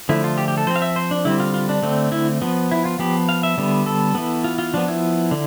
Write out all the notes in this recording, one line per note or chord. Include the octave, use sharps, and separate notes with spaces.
D3 F3 A3 E4
F4
G4
G4
A4
F3 C4 C5
F5
E5
C5
D4
D3 G3 C4 E4
F4
F4
D4
D3 A3 C4
E4
F3 B3
E4
F4
F3 B3 G4
F5
E5
D3 G3 B3
A4
E3 B3
F4
F4
F3 B3 D4
E4
D3